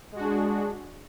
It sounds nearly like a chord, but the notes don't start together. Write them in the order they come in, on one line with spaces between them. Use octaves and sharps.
G#3 F#4 D4 G#4